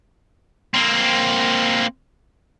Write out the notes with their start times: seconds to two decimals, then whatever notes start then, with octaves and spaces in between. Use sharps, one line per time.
0.74 A#3 C4